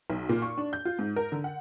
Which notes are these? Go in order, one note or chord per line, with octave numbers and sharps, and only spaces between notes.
B1
A#2
C#6
D4
G6
F4
G#2
A#4
D3
F#5